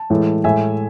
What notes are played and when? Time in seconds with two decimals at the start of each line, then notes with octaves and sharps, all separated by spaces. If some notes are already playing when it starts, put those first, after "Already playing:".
Already playing: A5
0.10 A2 E3 G#3
0.44 A2 G#3 E5 G#5